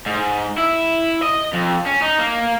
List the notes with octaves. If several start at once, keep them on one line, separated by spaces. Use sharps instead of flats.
G#2
E4
D#5
F2
C#4
D#4
A#3